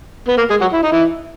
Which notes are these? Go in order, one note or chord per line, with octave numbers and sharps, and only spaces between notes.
B3
A#3
G#3 G#4
F#3 F#4
E4
D#4
E3 E4